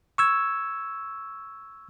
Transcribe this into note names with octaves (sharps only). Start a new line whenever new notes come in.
C#6 E6 G#6